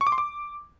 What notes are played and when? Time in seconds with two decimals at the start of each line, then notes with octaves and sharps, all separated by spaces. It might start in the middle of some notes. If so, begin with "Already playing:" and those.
0.01 C#6
0.07 D6
0.12 C6
0.18 D6